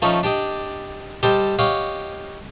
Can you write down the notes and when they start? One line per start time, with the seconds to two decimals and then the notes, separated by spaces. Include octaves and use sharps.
0.02 F3 A3 C#4 D#4
0.23 D4 G4 D5 D#5
1.23 G3 G4 A4 C5 D#5
1.59 G4 C#5 D#5 F5 F#5